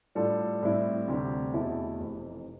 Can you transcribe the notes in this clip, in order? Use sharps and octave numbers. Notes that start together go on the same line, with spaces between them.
A2 G3 D4 F4 A4
A2 G3 C4 E4
D2 C3 G3 C4 G4
E2 B2 A3 E4 A4
F1 F2 C3 E3